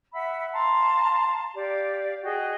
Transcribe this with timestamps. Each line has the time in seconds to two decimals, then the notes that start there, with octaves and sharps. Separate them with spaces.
0.13 E5 F#5 B5 E6
0.53 F5 A5 A#5 C6
1.54 G4 D5 F5
2.22 F#4 G#4 D#5 G5